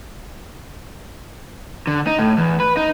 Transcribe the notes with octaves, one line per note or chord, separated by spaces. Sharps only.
D3
D#4
A2
E2
B4
D#4